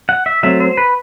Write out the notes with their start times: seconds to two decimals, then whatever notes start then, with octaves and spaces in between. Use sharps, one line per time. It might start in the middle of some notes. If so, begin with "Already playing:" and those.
0.09 F#5
0.26 E5
0.43 F#3 A3 C4 E5
0.60 C5
0.77 B4